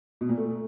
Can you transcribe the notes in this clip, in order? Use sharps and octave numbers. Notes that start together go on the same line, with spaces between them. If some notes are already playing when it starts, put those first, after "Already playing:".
B2
A#2
A3